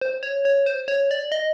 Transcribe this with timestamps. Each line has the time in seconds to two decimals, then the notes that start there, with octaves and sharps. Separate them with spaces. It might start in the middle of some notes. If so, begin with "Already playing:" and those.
0.01 C5
0.23 C#5
0.45 C#5
0.66 C5
0.88 C#5
1.11 D5
1.32 D#5